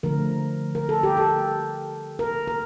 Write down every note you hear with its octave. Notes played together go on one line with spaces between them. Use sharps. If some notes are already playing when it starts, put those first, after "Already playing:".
D3 F3 A3 A#4
A#4
A4
G4
A4
A#4
A#4